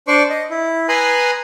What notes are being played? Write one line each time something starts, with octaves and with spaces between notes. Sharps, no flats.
D4 C5 D5 C#6
D#5
E4
B4 G#5 A#5 C6 D#6 F#6